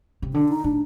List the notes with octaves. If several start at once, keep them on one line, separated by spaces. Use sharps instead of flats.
C3
D3 D4
D#4
A2 D4